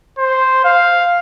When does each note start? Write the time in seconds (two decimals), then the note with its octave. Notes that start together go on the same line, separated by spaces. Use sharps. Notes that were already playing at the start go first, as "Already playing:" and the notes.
0.18 C5
0.64 F5